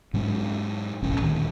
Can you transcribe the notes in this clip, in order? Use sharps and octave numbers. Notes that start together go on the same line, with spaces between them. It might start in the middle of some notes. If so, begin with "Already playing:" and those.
G#2 F#3 G#3 B3
E1 A1 C#4
D2 A#2 D#3